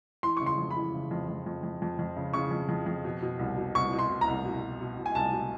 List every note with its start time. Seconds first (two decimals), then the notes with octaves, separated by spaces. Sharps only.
0.23 E3 C6
0.37 C#3 C#6
0.46 C6
0.58 F2
0.71 B5
0.76 E3
0.94 C#3
1.11 F2
1.28 F2
1.46 F2
1.63 F2
1.82 F2
1.99 F2
2.16 C#3
2.34 C#3 C#6
2.51 F2
2.69 F2
2.86 F2
3.04 B2
3.22 B2
3.39 C2
3.57 B2
3.75 C2 C#6
3.93 B2
3.99 C6
4.10 B2
4.21 A#5
4.28 C2
4.45 B2
4.62 B2
4.81 B2
4.98 B2
5.06 G#5
5.15 C2 A5
5.33 B2